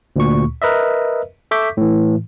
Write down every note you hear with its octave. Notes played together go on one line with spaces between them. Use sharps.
D2 A#2 C#6
A#4 B4 D#5 E5
A4 E5 C#6 D6 G6 B6
A2 E3